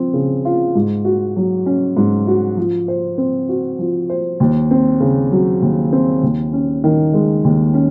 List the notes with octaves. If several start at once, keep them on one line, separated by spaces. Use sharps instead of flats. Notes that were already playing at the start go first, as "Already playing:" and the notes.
Already playing: F3 C4
C#3
F4
G#2
F#4
F#3
C#4
G#2
F#4
F3
C5
C4
F#4
F3
C5
D#2
C4
C#3
F#3
D#2
C4
D#2
C#4
D#3
G#3
D#2
C#4